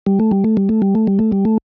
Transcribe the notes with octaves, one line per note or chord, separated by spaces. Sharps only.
G3
A3
G3
A3
G3
A3
G3
A3
G3
A3
G3
A3